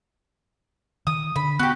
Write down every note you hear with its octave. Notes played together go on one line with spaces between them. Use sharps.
D#3 D#6
D3 B5
B3 F#4 G4